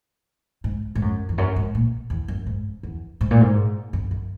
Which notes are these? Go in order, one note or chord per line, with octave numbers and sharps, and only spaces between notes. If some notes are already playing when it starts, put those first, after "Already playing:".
G#2
G#2
F#2
E2
F#2
G#2
A#2
E2
F#2
G#2
E2
G#2
A#2
G#2
F#2
F#2